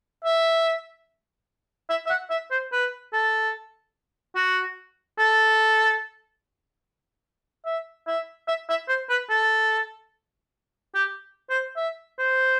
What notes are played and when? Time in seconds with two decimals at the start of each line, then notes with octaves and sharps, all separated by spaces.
0.25 E5
1.90 E5
2.06 E5
2.10 F#5
2.30 E5
2.51 C5
2.72 B4
3.14 A4
4.36 F#4
5.19 A4
7.66 E5
8.07 E5
8.48 E5
8.69 E5
8.88 C5
9.09 B4
9.30 A4
10.95 G4
11.50 C5
11.76 E5
12.19 C5